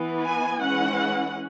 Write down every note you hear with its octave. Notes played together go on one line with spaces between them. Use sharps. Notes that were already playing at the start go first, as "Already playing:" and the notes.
Already playing: E3 B3
G#5
E3 G#3 C#4 F#5